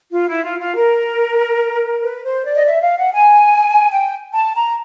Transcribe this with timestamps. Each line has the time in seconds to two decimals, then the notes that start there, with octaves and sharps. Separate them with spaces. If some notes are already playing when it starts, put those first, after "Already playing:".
0.13 F4
0.29 E4
0.44 F4
0.60 F4
0.76 A#4
2.02 B4
2.24 C5
2.45 D5
2.55 D#5
2.65 E5
2.81 F5
2.97 F#5
3.13 G#5
3.92 G5
4.34 A5
4.55 A#5